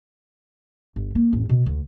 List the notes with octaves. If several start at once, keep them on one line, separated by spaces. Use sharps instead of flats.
G1
A#3
A1 F2
B2
D2